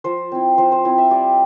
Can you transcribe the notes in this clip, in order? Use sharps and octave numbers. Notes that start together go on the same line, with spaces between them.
F3 C5
C4 E4
F3 C5
C5
C4 E4
E5
G3 D5